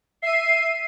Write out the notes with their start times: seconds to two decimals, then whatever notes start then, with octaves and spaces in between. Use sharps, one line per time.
0.22 E5 C7 D#7